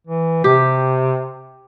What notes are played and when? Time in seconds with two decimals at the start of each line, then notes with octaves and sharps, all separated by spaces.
0.07 E3
0.44 C3 G4